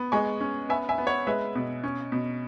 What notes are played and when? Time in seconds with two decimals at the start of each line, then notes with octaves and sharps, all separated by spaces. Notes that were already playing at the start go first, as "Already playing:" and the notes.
Already playing: B3
0.12 G#3 G#5 C#6
0.41 C#4
0.69 B3 E5 G#5
0.89 E5 G#5
0.98 B3
1.07 C#5 F#5
1.27 G#3 B4 E5
1.55 B2
1.84 C#4
2.12 B2